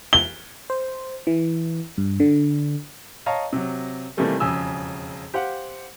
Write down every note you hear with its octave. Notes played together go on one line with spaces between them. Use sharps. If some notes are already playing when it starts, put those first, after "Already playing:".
G7
C5
E3
G2
D3
C#5 D#5 F5 A5 A#5
C3 F#3
C3 D#3 E3 G3 A3 A#3
E1 F2 C#3 G#5 D#6 E6
G4 C5 F5 F#5